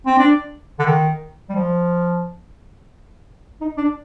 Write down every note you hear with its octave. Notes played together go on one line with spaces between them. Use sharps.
C4
D4
D3
D#3
G3
F3
D#4
D4